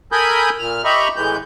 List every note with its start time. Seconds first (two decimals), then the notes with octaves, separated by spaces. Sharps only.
0.12 A4 A#4 G#5 B5 D#6 G6
0.59 A#2 F6
0.85 G4 D#5 E5 A#5 B5 C#6
1.16 A2 E3 G#3 B3 G6